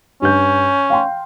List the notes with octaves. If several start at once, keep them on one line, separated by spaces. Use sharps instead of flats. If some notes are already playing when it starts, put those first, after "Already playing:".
G2 C#4 G6
F5 G5 C6